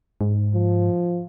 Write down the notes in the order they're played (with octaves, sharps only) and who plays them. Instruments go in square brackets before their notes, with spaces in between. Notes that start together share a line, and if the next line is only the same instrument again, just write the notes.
[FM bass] G#2
[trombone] F3